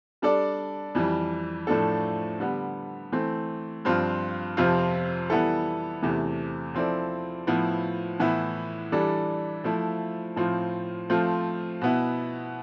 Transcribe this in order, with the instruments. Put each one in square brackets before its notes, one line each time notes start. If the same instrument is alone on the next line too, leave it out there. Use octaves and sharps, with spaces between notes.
[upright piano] G3 D4 A4 D5
F2 E3 G3
A2 F3 A3 D4 A4
D3 G3 B3
E3 A3 C4
G2 F3 C4 F4
F2 C3 F3 C4 F4
E3 G3 B3 E4 A4
E2 C3 E3 A3
F3 C4 E4 A4 D5
A2 F3 B3 E4
A2 E3 B3 E4
E3 G3 D4 A4 D5
F3 A3 E4
A2 F3 C4 F4
F3 A3 C4 F4
B2 B3 E4